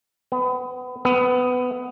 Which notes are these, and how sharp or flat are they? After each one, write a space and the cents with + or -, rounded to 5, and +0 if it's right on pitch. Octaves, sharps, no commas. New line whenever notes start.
B3 +30
B3 +20